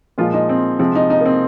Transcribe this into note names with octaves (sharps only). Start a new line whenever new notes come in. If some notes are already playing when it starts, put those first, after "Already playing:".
A#2 F3 G#3 F4
D#4
C4
C3 F3 G#3 C4
D#4
D#4
A#3
C4